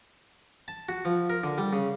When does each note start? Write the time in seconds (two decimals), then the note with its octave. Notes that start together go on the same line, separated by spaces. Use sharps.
0.68 A5
0.89 F#4
1.05 F3
1.30 A#4
1.44 D3
1.58 G3
1.73 C#3